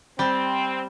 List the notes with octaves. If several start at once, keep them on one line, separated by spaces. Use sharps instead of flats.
G3 C4